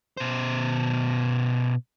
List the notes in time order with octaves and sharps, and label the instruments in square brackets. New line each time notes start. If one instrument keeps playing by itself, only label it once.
[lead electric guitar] B2 C5